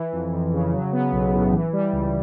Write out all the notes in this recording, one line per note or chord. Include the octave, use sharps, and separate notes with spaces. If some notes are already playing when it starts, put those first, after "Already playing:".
Already playing: E3
F2
F2
C#3
F#3
B3
B1
A2
E3
G3
C#2